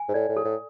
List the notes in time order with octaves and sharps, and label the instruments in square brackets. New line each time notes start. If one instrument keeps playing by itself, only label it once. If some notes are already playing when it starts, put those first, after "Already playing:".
Already playing: [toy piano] G#5
[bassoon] G#2
[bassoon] A2 [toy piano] D5
[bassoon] A2
[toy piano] A4
[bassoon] A2